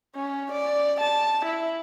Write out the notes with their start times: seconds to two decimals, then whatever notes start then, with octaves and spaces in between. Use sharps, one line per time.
0.15 C#4
0.52 D5
1.01 A5
1.45 E4